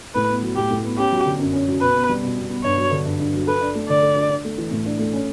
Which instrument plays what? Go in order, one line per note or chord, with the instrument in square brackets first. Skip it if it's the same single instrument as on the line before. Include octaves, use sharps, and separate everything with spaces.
[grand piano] A2 [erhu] B4
[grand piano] B3
F#3
[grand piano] A2 [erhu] G4
[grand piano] A2
B3
[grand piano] C#4 [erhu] G4
[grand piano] F#3
D3
F#2
C#4
F#3
[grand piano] B2 [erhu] B4
[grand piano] B3
G3
B2
B2
B3
[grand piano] G2 [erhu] C#5
[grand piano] F#3
D3
G2
G2
F#3
[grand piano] A4 [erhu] B4
[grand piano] D4
A3
[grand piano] D3 [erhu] D5
[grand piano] A4
D4
D4
A3
E3
A2
D4
A3
C#4